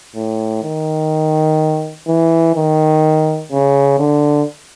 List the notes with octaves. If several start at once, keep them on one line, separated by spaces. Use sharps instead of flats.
A2
D#3
E3
D#3
C#3
D3